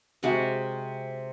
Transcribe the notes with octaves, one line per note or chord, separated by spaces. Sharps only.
C3 G#3 F#4 A#5